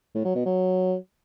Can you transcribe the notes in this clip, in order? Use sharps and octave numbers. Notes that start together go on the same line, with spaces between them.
A2
F#3
B2
F#3